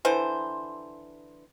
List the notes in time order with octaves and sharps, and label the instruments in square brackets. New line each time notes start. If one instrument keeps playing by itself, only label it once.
[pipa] D3 E3 C5